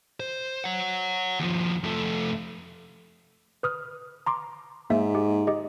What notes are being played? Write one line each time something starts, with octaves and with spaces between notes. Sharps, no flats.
C5
C#5 F#5
D#2 F3
F2 A3
B4 D#6 F6
A#5 C6 D6
G#2 A#3 D#4 E5
G4
G4 D#5